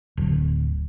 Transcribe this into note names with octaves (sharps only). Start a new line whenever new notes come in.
D1